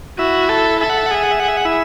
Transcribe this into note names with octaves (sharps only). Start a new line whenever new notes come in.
E4 F#4 E5
A4
A4 E5
F#5
E5
F#5
G#4 E5
F#5
E5
G#4 F#5
E5
F#5
E4 E5